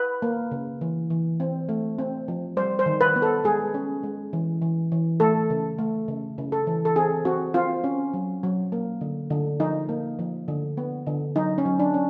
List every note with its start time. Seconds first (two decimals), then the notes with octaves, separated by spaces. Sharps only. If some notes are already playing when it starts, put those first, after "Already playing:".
Already playing: B4
0.22 A#3
0.51 C#3
0.81 E3
1.10 E3
1.40 C4
1.69 A3
1.99 C4
2.28 F3
2.57 G3 C5
2.79 C5
2.86 D#3
3.01 B4
3.16 B3
3.22 A4
3.44 G#3 G#4
3.74 C#4
4.03 G#3
4.33 E3
4.62 E3
4.92 E3
5.20 A3 A4
5.50 C#3
5.78 A3
6.08 C#3
6.38 C#3
6.52 A4
6.67 E3
6.85 A4
6.96 C4 G#4
7.25 C4 F#4
7.54 C4 F4
7.84 C#4
8.14 F#3
8.43 F#3
8.72 A#3
9.01 D3
9.30 D3
9.60 F3 D#4
9.89 A#3
10.19 F3
10.48 D3
10.77 B3
11.07 D3
11.36 F#3 D#4
11.58 C#4
11.65 F#3
11.79 D4
11.94 C#4